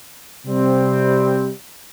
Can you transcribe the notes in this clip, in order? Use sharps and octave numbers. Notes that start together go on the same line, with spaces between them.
C3 G3 C4